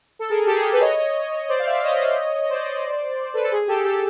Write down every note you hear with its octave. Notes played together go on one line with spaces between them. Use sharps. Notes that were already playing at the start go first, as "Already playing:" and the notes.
A4
G#4 A#4
G4 A4
G#4
G4
A4 B4
C#5 D#5
C5 D5
F5
D5 E5
C#5 D#5
C5 D5
A4 B4
A4
G#4
G4 A4
G4 A4